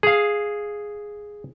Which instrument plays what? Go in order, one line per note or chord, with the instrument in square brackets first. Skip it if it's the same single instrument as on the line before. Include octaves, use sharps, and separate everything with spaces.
[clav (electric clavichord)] G#4 F5